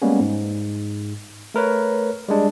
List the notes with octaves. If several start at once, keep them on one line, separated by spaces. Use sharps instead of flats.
G3 G#3 A#3 B3 C#4
G#2
A3 A#4 B4 C#5
G3 G#3 D4